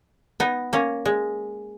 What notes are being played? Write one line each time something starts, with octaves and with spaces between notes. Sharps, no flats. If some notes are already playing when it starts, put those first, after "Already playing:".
B3 D#4
A#3 C#4
G#3